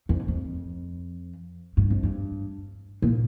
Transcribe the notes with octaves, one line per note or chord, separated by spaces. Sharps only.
F2
F2
G2
F2
G2
A#2